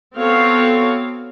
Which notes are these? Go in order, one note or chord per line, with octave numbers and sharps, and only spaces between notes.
B3 C4 F#4 A4 C#5 F5